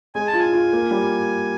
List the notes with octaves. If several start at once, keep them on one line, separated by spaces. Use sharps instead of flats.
G#3 G#5
A5
F4
G#5
F4
A#3
G3